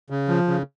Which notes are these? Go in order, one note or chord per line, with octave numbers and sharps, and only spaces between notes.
C#3
F3
C#3